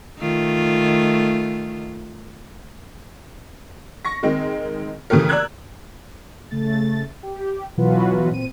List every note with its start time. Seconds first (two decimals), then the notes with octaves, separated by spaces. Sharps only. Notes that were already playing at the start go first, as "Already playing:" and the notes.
0.19 D#3 A3 F4
4.05 C#6 A#6
4.23 D#3 G#3 C4
5.10 C#3 E3 A3 G4 A#4
5.29 D5 A#5 E6 F#6 G#6
6.51 C#3 A3 A6
7.23 G4
7.77 B2 E3 F#3 F4 F#4 B4
8.31 A#2 C4 D#7